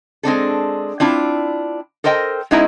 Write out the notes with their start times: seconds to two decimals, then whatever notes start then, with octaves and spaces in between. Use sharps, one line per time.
0.23 G#3 C4 D4 A4
1.00 C4 D4 E4 F4
2.04 A4 A#4 C5 D#5 G5
2.51 G#3 B3 C#4 D#4 E4 A#5